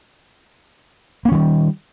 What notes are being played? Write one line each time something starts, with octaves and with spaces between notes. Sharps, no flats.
D#3 G3 A#3 C#4